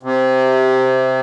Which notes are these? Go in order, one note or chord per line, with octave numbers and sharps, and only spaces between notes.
C3